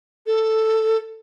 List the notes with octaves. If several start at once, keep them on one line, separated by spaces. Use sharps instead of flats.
A4